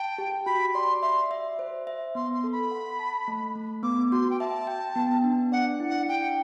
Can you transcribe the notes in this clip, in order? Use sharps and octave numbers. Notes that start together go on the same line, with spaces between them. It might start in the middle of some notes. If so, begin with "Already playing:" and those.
Already playing: G5 A5
G4
F#4 B5
D5 C6
E5 C6
E5
C5
E5
B3 C6
C6
A4
B5
F#5
A5
A3
A3
B3 D6
F#4 C6
G5
E5 A5
G5
B3
D4
D5 F#5
E4
F#5
D4 G5